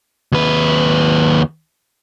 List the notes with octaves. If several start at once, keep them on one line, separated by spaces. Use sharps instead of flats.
D#2 B4